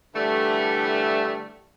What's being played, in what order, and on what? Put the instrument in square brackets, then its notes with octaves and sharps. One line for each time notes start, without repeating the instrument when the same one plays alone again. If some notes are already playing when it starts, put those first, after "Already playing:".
[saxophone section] D3 E3 G3 A3